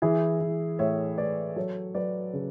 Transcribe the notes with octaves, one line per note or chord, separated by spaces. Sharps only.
E3 E4 G#4
E3
A2 C#5 E5
A2 B4 D5
F#3 A4 C#5
F#3 B4 D5
C#3